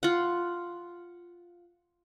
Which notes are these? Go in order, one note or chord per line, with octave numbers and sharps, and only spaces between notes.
F4 F#5